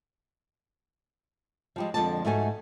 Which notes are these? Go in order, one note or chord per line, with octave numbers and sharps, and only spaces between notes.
F3 G3 G#3
F2 D3 F3 G#3 D5 A5
G#2 A3 D#4 F#4 A4 G#5